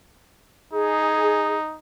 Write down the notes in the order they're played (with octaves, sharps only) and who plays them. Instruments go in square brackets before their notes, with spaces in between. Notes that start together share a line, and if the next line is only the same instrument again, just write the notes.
[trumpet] D#4 [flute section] G#4